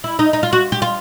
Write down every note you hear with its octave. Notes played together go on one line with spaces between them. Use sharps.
E4
D#4
D#4
F4
F#4
G4
F4